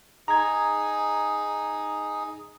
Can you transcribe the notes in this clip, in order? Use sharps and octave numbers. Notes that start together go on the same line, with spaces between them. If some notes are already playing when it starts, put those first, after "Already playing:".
D#4 G#4 A#5 G#6